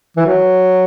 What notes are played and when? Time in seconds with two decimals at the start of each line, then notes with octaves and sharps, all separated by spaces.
0.17 E3
0.26 F#3